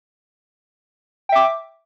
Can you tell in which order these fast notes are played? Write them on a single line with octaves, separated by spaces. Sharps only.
G5 E5 D6